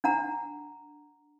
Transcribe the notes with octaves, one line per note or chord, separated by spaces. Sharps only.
D4 F#5 A#5